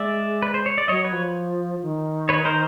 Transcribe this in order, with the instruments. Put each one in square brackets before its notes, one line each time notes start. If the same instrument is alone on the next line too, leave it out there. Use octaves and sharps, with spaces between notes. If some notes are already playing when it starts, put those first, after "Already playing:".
Already playing: [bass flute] G#3 [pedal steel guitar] D5 E5
[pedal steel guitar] B4
C5
C#5
D5
[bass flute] F#3 [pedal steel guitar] C#5 D#5
[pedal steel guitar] B4 C#5
[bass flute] F3
D#3
[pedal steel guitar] B4 C#5
A#4 C5